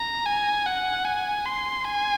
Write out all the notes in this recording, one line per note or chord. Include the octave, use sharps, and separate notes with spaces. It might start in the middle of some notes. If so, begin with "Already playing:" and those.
Already playing: A#5
G#5
F#5
G#5
C6
G#5